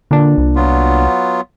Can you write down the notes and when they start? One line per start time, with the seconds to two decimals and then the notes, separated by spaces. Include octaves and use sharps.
0.11 A#2 D3 D4
0.38 C2
0.56 F#3 B3 F4